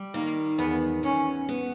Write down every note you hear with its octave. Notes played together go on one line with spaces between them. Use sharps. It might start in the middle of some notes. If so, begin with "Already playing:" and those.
Already playing: G3
D#3 A#3
E2 B3
E2 C#4
B3